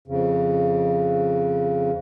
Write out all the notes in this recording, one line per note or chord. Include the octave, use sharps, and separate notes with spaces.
F2 C#3